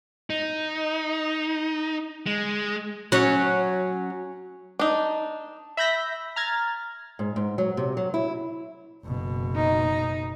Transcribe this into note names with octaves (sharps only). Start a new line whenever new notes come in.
D#4
G#3
F#3 C#4
D4 D#4
E5 B5 G6 A#6 B6
A#5 F6 G#6 A6
G#2
G#2
F#3
C3
F#3
E4
F#1 B2
D#4